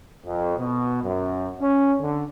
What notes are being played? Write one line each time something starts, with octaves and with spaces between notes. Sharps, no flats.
F2
B2
F#2
C#4
D3